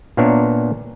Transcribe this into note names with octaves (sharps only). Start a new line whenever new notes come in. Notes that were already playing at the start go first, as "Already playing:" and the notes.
A#2 A#3 B3 D4 C#5 E5